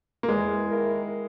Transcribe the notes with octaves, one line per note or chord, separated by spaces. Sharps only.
A#3
E2 G#3
D#3 A#3 E4 A#4